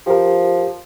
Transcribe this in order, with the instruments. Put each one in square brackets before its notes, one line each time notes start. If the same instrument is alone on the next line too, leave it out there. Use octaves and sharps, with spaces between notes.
[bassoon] F3 [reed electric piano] G4 A#4